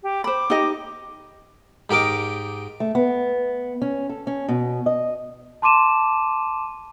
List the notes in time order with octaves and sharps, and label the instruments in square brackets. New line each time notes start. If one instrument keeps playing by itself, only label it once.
[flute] G4
[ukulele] C5 B5 [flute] D6
[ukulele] D#4 G4 D#5
[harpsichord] G#2 G4 A#4 D#5 D6
[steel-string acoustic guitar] A3
B3
C#4
A4
C#4
B2
D#5
[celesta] A5 C6 D6 D#7 E7